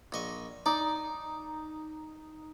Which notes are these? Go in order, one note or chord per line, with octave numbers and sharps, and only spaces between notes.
A#1 D#5 C#6
D#4 D5